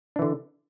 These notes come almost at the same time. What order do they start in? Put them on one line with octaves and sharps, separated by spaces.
D4 E3 D3